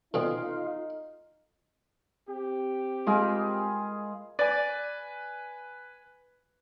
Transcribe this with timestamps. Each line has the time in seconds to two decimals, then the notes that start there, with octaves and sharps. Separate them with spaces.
0.14 B2 E3 C4 D#4 F4 A4 D5 G#5
2.29 C4 G4
3.06 G#3 F4 G#4 A#4 B5
4.39 B4 D5 G#5